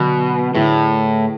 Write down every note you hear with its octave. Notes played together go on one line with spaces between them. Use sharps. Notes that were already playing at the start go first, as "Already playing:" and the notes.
Already playing: B2 D3 F#3 B3 F#4 B4
A2 D3 A3 E4 G#4 B4